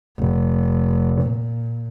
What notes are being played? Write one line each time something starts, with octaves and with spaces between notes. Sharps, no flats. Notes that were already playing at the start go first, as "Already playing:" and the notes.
F1
A#2